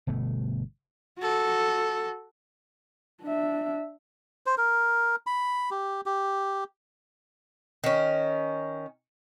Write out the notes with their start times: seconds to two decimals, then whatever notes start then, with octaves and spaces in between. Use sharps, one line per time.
0.07 G1 B2 A3
1.19 F#4 A4
3.23 D4 E5
4.46 C5
4.57 A#4
5.27 B5
5.71 G4
6.06 G4
7.84 D#3 C#4